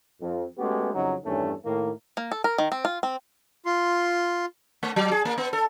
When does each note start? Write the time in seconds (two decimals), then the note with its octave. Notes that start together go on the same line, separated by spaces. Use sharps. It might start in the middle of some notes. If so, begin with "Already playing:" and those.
0.21 F2
0.58 G#3 A3 B3 C#4 F#4 G4
0.94 F2 C#3 F#3 D#4
1.24 E2 G2 D#3 A3 C#4
1.65 A2 D#3 A#3
2.17 A#3
2.31 A4
2.44 A#4
2.58 D#3
2.72 C4
2.85 F4
3.03 C4
3.66 F4 C6
4.83 A3
4.96 F#3
5.11 G#4
5.25 A#3
5.38 B3
5.53 A4